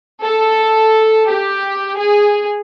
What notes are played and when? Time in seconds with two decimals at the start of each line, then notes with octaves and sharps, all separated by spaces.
0.23 A4
1.28 G4
1.97 G#4